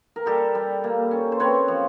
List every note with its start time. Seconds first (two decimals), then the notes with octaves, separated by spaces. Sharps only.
0.16 A#4
0.26 G3 G4 A4
0.55 G3
0.84 A#3
1.11 C#4
1.32 C5
1.40 C4 B4 C#5
1.68 F3